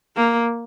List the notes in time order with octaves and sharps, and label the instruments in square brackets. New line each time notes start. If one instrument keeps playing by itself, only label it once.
[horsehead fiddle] A#3